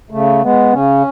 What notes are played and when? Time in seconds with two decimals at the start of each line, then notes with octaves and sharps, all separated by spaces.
0.10 C#3 A3
0.42 G#3 B3
0.72 C#3 C#4